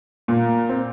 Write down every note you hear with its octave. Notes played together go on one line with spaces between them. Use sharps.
A#2 A#3
C4